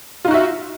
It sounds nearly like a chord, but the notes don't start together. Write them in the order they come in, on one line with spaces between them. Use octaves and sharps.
F4 D#4 F#4 E5